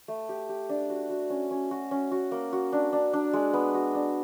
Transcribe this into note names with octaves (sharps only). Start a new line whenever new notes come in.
A3
G4
G4
D4
F#4
F#4
C#4
C#4
F#4
C#4
F#4
A#3
F#4
D4
D4
D4
G#3
B3
F#4
D4